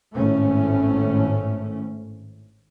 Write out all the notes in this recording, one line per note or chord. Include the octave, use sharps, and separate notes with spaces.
G#1 A2 A3 C#4